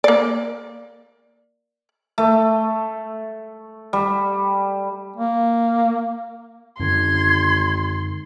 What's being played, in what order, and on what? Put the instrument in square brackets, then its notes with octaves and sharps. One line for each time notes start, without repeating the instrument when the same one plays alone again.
[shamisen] A#3 D5
[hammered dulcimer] A3
G3
[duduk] A#3
[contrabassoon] G#1 [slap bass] F#2 D3 [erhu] C6 [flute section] G#6